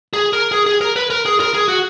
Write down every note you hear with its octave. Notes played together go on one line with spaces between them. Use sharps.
G#4
A#4
G#4
G#4
A#4
B4
A#4
G#4
A#4
G#4
F#4